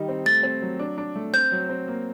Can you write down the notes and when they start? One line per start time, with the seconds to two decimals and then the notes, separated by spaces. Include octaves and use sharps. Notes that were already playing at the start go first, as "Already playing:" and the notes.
Already playing: D#3 G3 D#4
0.08 C4
0.26 A3 A6
0.43 C4
0.62 F#3
0.79 D4
0.98 D4
1.16 A3
1.33 C4 G6
1.52 F#3
1.69 C4
1.88 A#3